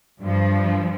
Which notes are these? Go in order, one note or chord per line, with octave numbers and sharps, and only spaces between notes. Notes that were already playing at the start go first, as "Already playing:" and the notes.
G2 F3